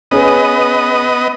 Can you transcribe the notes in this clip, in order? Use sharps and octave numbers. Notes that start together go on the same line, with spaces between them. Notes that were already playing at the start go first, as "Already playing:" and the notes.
B3 C#4 G#4 B4 D#5